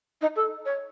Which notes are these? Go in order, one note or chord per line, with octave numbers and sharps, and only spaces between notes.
D#4
A4
C#5